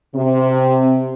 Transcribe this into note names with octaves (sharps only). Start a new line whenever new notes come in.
C3